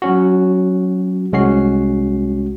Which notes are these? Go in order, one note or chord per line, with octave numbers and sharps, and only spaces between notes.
F#3 C#4 F#4
C2 G#3 C#4 F#4 C7